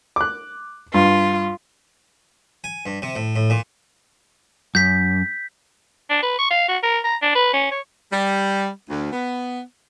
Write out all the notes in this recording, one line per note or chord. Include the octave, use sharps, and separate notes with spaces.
D6 F#6
G2 F4
G#5
G2
C3
A2
A2
A#2
F#2 G6 B6
D4
B4
C#6
F5
F#4
A#4
A#5
D4
B4
C#4
C#5
G3
D2
B3